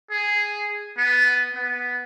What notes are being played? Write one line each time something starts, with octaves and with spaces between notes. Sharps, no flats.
G#4
B3
B3